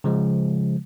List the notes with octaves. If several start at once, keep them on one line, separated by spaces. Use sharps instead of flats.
C#3 F3 G#3